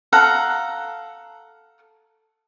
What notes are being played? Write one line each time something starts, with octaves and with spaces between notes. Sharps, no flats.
A4 F5 F#5 A#5